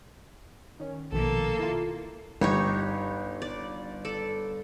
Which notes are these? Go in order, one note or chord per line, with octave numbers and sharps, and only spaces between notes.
D#3 C#4
A#1 B2 D#3 A#3 A4
E4 F4
G1 D#4 G4 C#5
D5
A4 D5